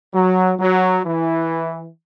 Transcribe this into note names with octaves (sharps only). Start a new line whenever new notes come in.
F#3
F#3
E3